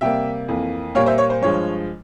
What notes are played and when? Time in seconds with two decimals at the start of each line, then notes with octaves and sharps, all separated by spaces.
0.01 C3 G3 A#3 E5 G5
0.48 F2 E3 A#3
0.95 A#2 G3 A#3 C#5 F5
1.06 C5 E5
1.18 C#5
1.30 C5
1.41 G2 F3 G#3 C#5